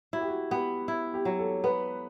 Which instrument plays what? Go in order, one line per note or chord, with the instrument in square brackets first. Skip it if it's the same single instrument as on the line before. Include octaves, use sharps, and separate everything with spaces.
[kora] E4 [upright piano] F#4
[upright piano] G4
F#4
[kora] B3 [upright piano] G4
[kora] E4
[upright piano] G4
[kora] F#3
[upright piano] A4
[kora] B3 [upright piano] B4